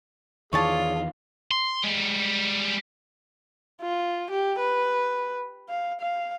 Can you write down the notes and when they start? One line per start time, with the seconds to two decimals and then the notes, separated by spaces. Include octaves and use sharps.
0.53 E2 D#3 E3 F4 G#4 C#5 D5 A5
1.51 C6
1.83 G3 G#3
3.82 F4
4.30 G4
4.59 B4
5.69 F5
6.01 F5